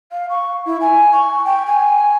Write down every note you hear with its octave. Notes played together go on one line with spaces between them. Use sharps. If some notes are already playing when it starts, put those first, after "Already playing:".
F5
C#6
E4
G#5
C#6
G5
G#5